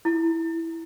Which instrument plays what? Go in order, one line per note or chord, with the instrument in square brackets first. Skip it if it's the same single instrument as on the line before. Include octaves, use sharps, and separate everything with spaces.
[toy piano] E4